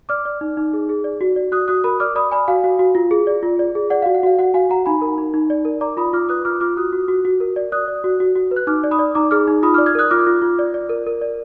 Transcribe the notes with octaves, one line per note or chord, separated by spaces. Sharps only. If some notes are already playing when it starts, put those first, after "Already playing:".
D5 D6 F6
D5
D#4
D#4
G#4
G#4
D5
F#4
D5
F#4 D#6 F#6
F#4 D#6 F#6
A#4 B5 D#6
D5 D6 F6
D5 B5 D#6
D5 G#5 B5
F#4 F5 G#5
F#4
F#4
F4
G#4
D5
F4
D5
G#4
D5 F#5
F5
F#4
F#5
F#4 F5
F#4 F#5
F#4 F5 G#5
F#4 F#5 A#5
D#4 G#5 B5
A#4
D#4
D#4
D5
A#4
D5 A#5 D6
F4 B5 D#6
F4 D6 F6
B4 D#6 F#6
F4 D6 F6
F4 D6 F6
F#4 D#6 F#6
F#4
F#4
F#4
A#4
D5
D5 D#6 F#6
D5
F#4
F#4
F#4
B4
F#6
D#4 D6 F6
D5
B5 D#6
D5
D#4 A#5 D6
G#4 D6 F6
D#4
F4 B5 D#6
D6 F6
D5
F6 G#6
A#4 D#6 F#6
F4 D6 F6
F4
F4
D5
D5
A#4
A#4
D5